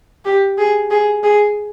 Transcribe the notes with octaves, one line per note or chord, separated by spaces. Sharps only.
G4
G#4
G#4
G#4